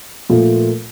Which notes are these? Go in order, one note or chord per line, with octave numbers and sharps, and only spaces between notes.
A#2 F3 A3